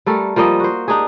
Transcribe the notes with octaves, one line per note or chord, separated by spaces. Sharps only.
G3 A3 A4 A#4
F3 G3 A#3 D#5
F#4 C5
D4 D#4 G4 G#4